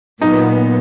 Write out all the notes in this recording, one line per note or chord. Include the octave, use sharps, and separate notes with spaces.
A#2 F#3 B3 D#4